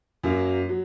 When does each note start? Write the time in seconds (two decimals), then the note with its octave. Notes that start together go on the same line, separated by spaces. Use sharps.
0.23 F#2 F#3 A#3
0.69 F#3